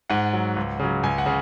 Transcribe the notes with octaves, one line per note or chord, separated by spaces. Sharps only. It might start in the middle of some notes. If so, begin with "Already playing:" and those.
G#2 F#5
F#3
C#2
C#3 F#3
C#2 G#5
F#5
C#3